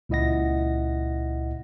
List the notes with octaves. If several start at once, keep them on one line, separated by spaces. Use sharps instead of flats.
C#2 A#2 E4 D#5 F#5 A#6